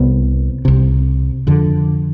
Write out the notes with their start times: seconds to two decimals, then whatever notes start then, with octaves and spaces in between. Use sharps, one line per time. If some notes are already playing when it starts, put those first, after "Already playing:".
Already playing: C2 C3 B3
0.65 C2 C3
1.47 F2 D3